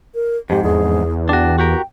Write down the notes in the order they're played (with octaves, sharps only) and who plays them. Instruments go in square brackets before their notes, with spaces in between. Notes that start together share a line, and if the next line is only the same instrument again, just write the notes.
[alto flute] A#4
[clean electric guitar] F2 G#2 [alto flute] G4
[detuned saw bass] E2 [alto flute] G#4
[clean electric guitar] D4 F#4 [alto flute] G5
[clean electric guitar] F#4 G4 A#4